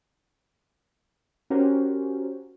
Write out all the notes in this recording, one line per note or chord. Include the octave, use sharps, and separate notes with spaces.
C#4 F#4 G4 A#4 C5